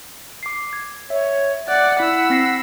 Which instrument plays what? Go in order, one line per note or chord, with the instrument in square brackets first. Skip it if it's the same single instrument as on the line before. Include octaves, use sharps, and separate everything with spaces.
[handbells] D6 C7
G#6
[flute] C#5 [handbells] E5
[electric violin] D5 F#6 [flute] F#5
[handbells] E4 [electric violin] B5 E6
[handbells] C4 A#6 C7